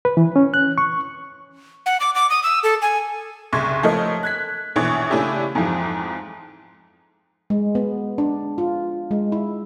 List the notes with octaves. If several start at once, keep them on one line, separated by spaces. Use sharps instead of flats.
B4
E3
C#4
F#6
C#6
F#5
D6
D6
D#6
E6
A4
G#5
F#1 C2 C6 C#6 G#6
F3 A3 A4 A#4 C#5 D#5
F#6 G#6 B6
A#1 B2 E3 C#5
C#3 A3 C#4 D4 E4 G4
F2 G#2 E3 F3
G#3
B3
D4
F4
G#3
E4